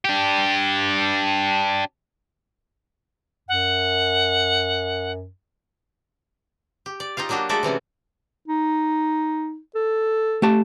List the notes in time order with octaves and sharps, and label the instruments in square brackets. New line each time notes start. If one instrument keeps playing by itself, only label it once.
[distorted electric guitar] D4 G4
[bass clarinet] F#2 [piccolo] F#5
[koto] G4
D5
D#4 F4 G4 F5
F#3 A#3 D4 F#4 G4
G#3 A3 F#4 A4 D5 E5
C3 E3 C#4 F#4
[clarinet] D#4
A4
[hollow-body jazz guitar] A3 G4 A5